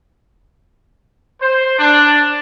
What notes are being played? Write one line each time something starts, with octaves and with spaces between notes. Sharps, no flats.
C5
D4